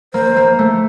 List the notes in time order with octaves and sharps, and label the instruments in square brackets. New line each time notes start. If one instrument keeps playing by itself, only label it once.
[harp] A#3 [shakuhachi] C5
[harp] A#3
A3